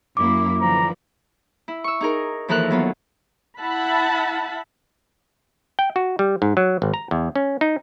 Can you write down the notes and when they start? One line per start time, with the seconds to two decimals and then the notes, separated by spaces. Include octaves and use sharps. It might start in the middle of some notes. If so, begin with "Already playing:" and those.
0.17 F#2 A#3 E4 D6
0.61 D3 E3 F3 A#5
1.68 E4
1.84 C#6 E6
2.01 D#4 G#4 A#4
2.48 D#2 E3 F3 A4 A#4 F#6
2.71 F#3 B3 F4
3.59 E4 E5 F#5 A5 B5
5.79 G5
5.96 F#4
6.19 G3
6.42 G#2
6.57 F#3
6.82 G#1
6.94 A#5
7.11 E2
7.36 C#4
7.61 D#4